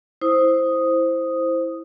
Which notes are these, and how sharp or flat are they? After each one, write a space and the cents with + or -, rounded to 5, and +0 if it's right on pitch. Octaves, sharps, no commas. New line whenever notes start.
E4 +0 C5 +0 D#6 +0